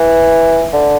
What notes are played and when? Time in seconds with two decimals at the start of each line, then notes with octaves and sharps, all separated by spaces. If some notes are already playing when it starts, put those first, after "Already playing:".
Already playing: E3
0.73 D3